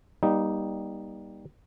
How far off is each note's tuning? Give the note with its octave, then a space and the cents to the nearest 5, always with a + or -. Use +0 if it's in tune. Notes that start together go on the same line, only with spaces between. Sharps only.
G3 +0 A#3 +45 D#4 +0